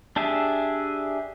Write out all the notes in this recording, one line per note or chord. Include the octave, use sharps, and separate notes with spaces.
D4 G4 G#4 E5